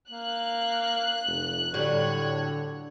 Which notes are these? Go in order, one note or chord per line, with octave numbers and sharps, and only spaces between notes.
A#3 F#6
F1
A2 D3 F#3 G3 C#5